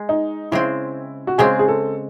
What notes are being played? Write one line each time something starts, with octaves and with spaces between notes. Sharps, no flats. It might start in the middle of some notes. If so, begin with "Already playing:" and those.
Already playing: G#3
D#4
C#3 G#3 C4 E4
F#4
C#3 G#3 C4 G#4
G#4
A4